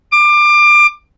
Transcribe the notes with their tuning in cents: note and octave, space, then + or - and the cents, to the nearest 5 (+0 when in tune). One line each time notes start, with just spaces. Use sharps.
D6 +25